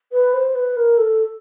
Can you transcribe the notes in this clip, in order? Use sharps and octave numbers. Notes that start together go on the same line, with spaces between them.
B4
C5
B4
A#4
A4